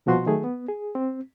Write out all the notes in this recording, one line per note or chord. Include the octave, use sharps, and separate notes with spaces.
C2 B2 F3 F#4 C6
D#3 F#3 A3 G#4
B3
G#4
C4